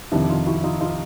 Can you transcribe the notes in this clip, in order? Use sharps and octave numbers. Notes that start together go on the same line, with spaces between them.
F2 C3 D#3 D4 E4
D#4 F4
E4 F#4
D#4 F4
D#4 F4